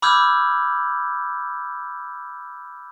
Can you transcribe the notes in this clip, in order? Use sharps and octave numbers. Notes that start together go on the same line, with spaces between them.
B5 D6 E6 F6 G6 G#6